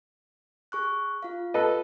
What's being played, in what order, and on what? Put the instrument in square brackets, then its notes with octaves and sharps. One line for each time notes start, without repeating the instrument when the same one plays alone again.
[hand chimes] G#4 C#6 F#6
F4 F5
[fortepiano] A4 B4 D#5